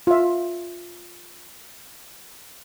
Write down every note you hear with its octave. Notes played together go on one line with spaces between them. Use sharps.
F4 E5